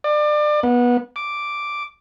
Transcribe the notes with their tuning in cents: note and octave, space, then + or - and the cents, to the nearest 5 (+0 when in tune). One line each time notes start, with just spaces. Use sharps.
D5 +30
B3 -20
D6 +0